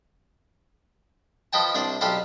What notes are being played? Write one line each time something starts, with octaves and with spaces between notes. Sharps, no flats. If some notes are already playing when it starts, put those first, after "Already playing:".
F3 B4 D#5 G5 A5
C2 D4 C5 D5
B1 G4 B4 C5 F5 A5